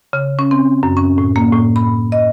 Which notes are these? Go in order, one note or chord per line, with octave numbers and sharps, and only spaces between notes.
C#3
C#4
C4
F#2
C#4
A2
A#3
A2
B5
D#5